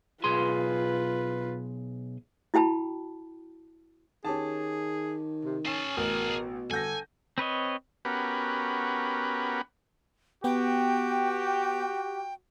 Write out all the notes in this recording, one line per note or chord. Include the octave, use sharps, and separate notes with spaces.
B1 F4 G#4 B4 C6
E4 F#4 G5 A5 B5
D#3 C#4 G4 G#4 A5
C3
C#4 G#4 A5 C7
A1 B2 A#4
G1 A4 G#5 G6 A#6
C4 B4 C#5 D#5
B3 C#4 F#4 G4 A#4 B4
B3 F#4 G4 G5